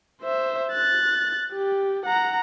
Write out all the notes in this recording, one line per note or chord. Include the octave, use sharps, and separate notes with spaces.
C5 E5
F#6 A6
G4
F#5 A#5